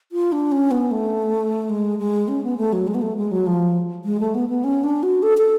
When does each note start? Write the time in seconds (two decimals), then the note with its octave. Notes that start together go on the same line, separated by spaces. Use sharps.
0.12 F4
0.32 D4
0.52 C#4
0.71 B3
0.91 A3
1.70 G#3
1.99 G#3
2.28 C#4
2.44 B3
2.57 A3
2.73 F#3
2.87 G#3
2.95 B3
3.02 A3
3.17 G#3
3.31 F#3
3.46 F3
4.05 G#3
4.20 A3
4.35 B3
4.49 B3
4.64 C#4
4.84 D4
5.03 F#4
5.23 A4
5.38 A4